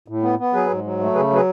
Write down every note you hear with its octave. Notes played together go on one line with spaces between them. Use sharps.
A2
B3
B3
F#3 G#4 B4
G#2
F#3
A3
C#3 G#4 B4
F#3 G#4 B4